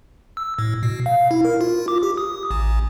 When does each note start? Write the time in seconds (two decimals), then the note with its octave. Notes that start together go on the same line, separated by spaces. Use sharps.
0.37 E6
0.59 A2
0.83 B2
1.06 F5
1.31 E4
1.45 A#4
1.61 F4
1.88 D6
2.03 G4
2.17 D#6
2.51 A1